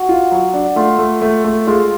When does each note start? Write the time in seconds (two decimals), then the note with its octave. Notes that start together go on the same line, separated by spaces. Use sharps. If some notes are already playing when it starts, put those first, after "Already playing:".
Already playing: F#4
0.09 F4
0.32 F#3
0.54 D4
0.76 A3 F4
0.99 A3
1.22 A3
1.44 A3
1.67 G#3 F4